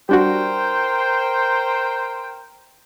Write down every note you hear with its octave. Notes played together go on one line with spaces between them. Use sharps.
G3 D4 F#4 A#4 C5 G5